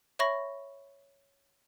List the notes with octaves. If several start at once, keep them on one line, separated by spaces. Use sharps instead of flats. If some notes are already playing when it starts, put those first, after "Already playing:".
C#5 E5 B5 C#6 A#6